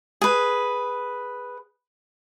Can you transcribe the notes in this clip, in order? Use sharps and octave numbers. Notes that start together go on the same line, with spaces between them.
G#4 B4